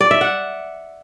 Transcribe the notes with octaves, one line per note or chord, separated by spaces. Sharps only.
D5
E5
F#5